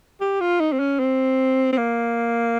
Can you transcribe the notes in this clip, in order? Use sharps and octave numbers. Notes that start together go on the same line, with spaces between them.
G4
F4
D#4
C4
C#4
C4
C4
A#3